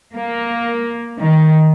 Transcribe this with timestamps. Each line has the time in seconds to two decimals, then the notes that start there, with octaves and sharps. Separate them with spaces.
0.14 A#3
1.19 D#3